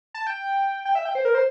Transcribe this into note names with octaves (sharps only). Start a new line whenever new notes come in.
A5
G5
G5
E5
G5
C5
A#4
C5